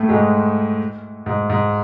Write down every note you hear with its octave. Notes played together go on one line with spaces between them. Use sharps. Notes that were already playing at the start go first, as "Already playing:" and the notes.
Already playing: A2 A3
G#2 G#3
G#2
G#2